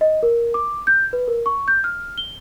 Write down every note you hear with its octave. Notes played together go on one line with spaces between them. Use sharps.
D#5
A#4
D6
G6
B4
A#4
C#6
G6
F6
G7